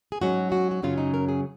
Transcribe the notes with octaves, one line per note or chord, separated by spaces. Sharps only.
G#4
G#2 F#3 C#4 F#4
F#4
F#4
F#2 C#3 F#3 C#4 F4
D#4
A#4
G#4